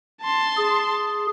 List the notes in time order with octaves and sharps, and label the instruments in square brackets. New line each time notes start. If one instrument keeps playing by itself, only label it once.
[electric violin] A5 C6
[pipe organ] G#4